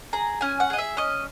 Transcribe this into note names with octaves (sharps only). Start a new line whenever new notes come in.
G#4 A#5
C#4 G#5
F#5
G#4 D#5
E5
C#4 D#5